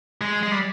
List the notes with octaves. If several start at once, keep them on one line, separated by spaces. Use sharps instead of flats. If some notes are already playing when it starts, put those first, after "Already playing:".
G#3
G#3
G3